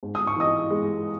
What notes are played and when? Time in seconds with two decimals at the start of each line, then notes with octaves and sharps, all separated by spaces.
0.03 G#2
0.15 D#6
0.27 C#6
0.36 E3 D#5 D#6
0.70 G#3